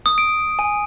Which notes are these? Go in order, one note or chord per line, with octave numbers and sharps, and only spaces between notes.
D#6
D7
G#5